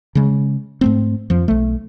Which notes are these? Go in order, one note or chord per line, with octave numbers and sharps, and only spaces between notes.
C#3 G#3
G#2 A3 C4
F2 F3
B1 A3